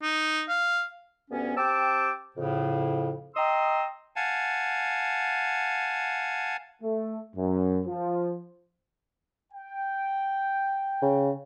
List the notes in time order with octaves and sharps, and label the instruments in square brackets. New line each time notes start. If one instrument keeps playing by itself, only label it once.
[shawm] D#4
F5
[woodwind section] D2 G2 B3 C#4
C4 G4 G5 A5 D6 E6
F2 A2 C#3
D#5 G5 A#5 C6 D#6 E6
[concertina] F5 F#5 G#5 A5
[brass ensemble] A3
F#2
F3
G5
[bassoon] C#3